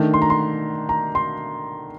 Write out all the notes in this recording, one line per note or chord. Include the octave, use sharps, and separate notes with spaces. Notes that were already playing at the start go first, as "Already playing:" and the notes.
Already playing: D#3 A3 D4
C6
A#5
C6
A#5
C6